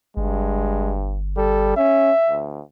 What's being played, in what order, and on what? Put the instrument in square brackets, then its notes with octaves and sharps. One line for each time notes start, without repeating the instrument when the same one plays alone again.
[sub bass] G1 [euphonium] G2 [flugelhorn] G#3
[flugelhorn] G3 [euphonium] A4
[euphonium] C#4 [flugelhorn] E5
[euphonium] D2